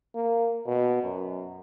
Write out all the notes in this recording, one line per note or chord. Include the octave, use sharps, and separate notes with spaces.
A#3
B2
F#2